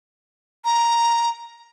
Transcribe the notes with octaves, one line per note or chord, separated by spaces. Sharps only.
A#5